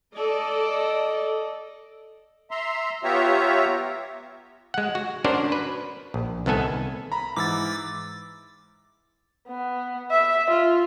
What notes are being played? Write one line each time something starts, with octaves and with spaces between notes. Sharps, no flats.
A4 D5 D#5
E5 A#5 C6
B3 F4 G4 C#5 E5 A#5
G#3 F#5
F#4
C#4 D4 F#4 A#4 C5 D5
B4
A#1
C2 D#3 B3 A4 G#5
A#5 B5
G#2 E3 D6 E6 A6
B3
E5
F4